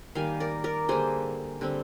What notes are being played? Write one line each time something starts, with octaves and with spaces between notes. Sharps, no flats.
D#3 G3 A#3 F5 G#5
A#4 D5
A#4 D5
D3 G3 A#3 G#4 C5
D3 G3 C4